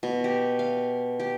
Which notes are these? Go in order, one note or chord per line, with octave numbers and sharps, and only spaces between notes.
B2
G4
F5
G4